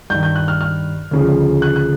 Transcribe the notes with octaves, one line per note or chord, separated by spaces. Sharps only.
G2 D#3 G6
G6
F#6
F6
F6
D2 C#3 F3
F#6
F#6